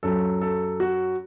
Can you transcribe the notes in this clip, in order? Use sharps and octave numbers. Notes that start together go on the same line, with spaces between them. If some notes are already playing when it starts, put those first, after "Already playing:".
F#2 F#3 A4
A4
F#4